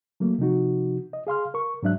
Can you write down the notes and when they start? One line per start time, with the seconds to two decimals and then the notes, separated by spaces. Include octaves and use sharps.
0.20 F#3 A3 A#3
0.39 C3 F3 D#4 F#4
1.13 D#5
1.27 G#4 F5 C6 F6
1.54 A#4 C#6
1.83 G#2 F#3 D4 E5 F#6